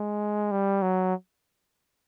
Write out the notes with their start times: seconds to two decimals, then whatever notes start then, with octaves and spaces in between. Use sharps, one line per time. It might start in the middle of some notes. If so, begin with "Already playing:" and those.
Already playing: G#3
0.52 G3
0.82 F#3